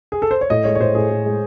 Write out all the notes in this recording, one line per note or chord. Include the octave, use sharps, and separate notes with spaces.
G#4
A4
C5
C#5
A2 D#5
G#3 C#5
C#5
A2 C5
A2 G#4
A2
G#3